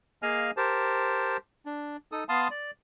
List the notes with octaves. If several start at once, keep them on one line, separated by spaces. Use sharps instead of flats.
A#3 G#4 D#5 F5 G#5 F6
G4 A#4 C5 A5
D4
D#4 A4 D#6
B3 F5 A5 C6 D#6
D5